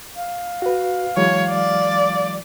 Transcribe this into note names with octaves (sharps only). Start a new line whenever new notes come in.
F5
F#4 B4
E3 F#3 G#3 C#5
D5